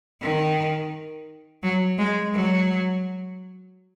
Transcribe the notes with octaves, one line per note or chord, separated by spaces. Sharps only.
D#3
F#3
G#3
F#3